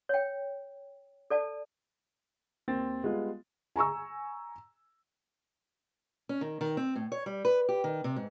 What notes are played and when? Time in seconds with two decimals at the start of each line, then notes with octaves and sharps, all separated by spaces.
0.09 C#5 G5
1.30 A4 D5 A5
2.68 D#2 C4 A6
3.03 G3 G#3 B3 F4
3.76 G#5 A#5 C#6 E6
6.29 C#4
6.41 D#3
6.61 D#3
6.77 C4
6.95 A2
7.12 C#5
7.26 G3
7.45 B4
7.69 G4
7.84 D#3
8.04 C3
8.16 G#2